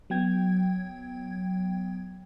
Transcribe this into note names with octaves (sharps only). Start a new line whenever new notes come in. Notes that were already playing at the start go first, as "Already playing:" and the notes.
F#3 B3 G5 G#6